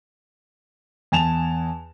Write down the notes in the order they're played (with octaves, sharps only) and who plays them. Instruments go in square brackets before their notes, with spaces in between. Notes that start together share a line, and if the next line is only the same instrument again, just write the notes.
[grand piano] E2 G#5 A5 E7 F7